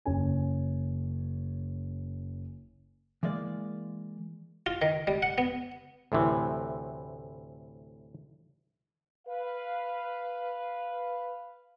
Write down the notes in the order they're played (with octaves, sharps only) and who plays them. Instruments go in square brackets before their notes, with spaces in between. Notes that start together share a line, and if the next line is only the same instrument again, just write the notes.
[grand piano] F#1 C#4 G#5
[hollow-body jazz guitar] E3 G#3 A#3 D5
[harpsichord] F4
D#3
G3
F#5
B3
[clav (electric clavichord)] D2 A2 C3 E3
[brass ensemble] B4 F5